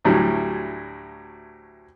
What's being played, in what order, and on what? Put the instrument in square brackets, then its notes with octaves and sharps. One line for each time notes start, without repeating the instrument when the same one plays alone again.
[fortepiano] D2 A2 F#3 G3